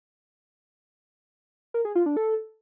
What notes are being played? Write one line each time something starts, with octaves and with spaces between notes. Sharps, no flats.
A#4
G#4
F4
D4
A4